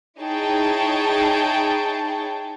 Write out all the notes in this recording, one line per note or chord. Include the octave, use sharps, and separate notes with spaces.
D#4 E4 G#4 C#5 G5 A5